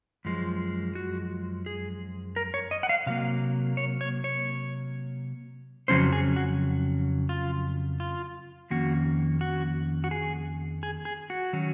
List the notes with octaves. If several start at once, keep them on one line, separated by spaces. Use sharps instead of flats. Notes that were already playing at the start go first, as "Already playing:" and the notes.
F#2 F3 G#3
F#4
G#4
A#4
C#5
D#5
F#5
F5
C3 F#3 A#3 F5
C#5
C#5
C#5
F2 C#3 F#3 C#4 C5
G#4
F#4
F4
F4
F2 D#3 A#3 C#4 F#4
F#4
F#4
G#4
G#4
G#4
F#4
D#3 F#3 C#4